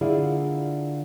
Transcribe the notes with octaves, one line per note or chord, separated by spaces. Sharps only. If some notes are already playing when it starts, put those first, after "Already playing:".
D3 A#3 E4 F4 G#4 D5